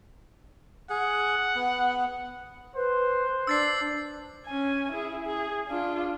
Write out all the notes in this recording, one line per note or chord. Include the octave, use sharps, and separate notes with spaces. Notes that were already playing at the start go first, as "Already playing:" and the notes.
G#4 F#5
B3
B4 C5
D4 E6 A6 C7
C#4 G#5
E4 G#4
G#4
D4 F4